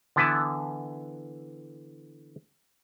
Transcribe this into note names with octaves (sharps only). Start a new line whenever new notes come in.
D3 E3 B3 E4 B4 A5